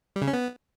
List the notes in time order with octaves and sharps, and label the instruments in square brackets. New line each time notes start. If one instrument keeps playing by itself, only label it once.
[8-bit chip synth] G3
C#3
C#4
B3